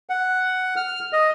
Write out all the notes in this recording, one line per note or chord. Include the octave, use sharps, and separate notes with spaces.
F#5
F6
D#5